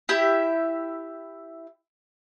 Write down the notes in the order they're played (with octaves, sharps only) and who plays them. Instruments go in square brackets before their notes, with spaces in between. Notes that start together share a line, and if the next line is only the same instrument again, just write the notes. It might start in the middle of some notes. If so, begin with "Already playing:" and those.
[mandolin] E4 G4 E5